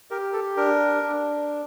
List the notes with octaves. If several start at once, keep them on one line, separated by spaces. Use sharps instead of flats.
G4 A#4
A4
D4 A#4
D4